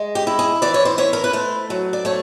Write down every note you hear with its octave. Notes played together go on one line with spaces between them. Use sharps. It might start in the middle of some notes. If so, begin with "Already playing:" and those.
Already playing: G#3
G4
E4
G#4
E3 D5
C#5
C5
E4 C#5
A#4
B4
A3 C5
F#3
D5
A3 C#5